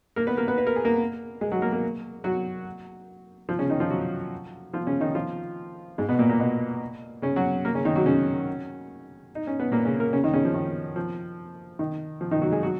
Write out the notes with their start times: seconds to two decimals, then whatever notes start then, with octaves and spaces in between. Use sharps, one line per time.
0.16 A#3 A#4
0.27 B3 B4
0.37 A#3 A#4
0.48 B3 B4
0.58 B4
0.67 A#4
0.76 G#4
0.85 A#3 A#4
1.41 G#3 G#4
1.52 F#3 F#4
1.62 A#3 A#4
1.72 A#3 A#4
2.24 F#3 F#4
3.49 F3 F4
3.59 C#3 C#4
3.70 D#3 D#4
3.80 F3 F4
3.90 F#3 F#4
4.73 F3 F4
4.87 C#3 C#4
5.01 D#3 D#4
5.15 F3 F4
5.98 G#2 G#3
6.09 B2 B3
6.19 A#2 A#3
6.29 A#2 A#3
6.40 B2 B3
7.22 C#3 C#4
7.36 F#3 F#4
7.65 A#3 A#4
7.74 C#3 C#4
7.85 D#3 D#4
7.95 F#3 F#4
8.06 C#3 C#4
9.35 D#4
9.47 C#4
9.60 B3
9.72 A#2 A#3
9.85 C#3 C#4
10.00 A#3 A#4
10.13 C#3 C#4
10.24 D#3 D#4
10.33 C#3 C#4
10.45 F3
10.54 D#3
10.96 F3
11.79 D#3
12.21 F3
12.31 D#3 D#4
12.41 F#3 F#4
12.51 G#3 G#4
12.63 F#3 F#4